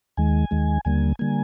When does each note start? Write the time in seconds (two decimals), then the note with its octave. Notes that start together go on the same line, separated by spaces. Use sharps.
0.17 D#2 D#3 G#3 G#5
0.51 D#2 D#3 G#3
0.85 D#2 D3 G3 A#3 G#5
1.19 D3 G3 A#3 G#5